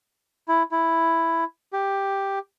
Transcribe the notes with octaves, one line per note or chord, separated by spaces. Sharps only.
E4
E4
G4